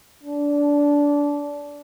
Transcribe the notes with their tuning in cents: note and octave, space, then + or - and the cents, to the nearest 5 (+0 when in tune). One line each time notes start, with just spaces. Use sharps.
D4 -20